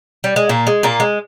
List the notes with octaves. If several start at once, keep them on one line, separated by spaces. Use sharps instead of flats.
G3
G#3
A#2 A#3
G#3
A#2 A#3
G#3